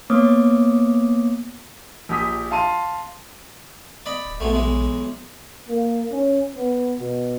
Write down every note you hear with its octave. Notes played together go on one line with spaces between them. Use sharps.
A#3 B3 C#5 D6 D#6
A#1 G4 G#5 D#6 B6
F5 A5 C6 D#7
D5 D#5 B5
D1
A#1 B2 G#3 A3
B1 E3 G#3
A#3
C#4
B3
B2